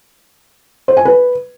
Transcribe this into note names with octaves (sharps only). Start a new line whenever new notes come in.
C5
G#5
B4